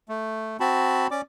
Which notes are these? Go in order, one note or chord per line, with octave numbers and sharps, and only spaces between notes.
A3
C4 F#4 A5 B5
C#4 D5 D6